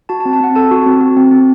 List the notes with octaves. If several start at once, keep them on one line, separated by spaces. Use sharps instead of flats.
F#4 A5
A5
C4
A5
C4 F#5
A4 A5
F#4
C4
F#4
C4
C4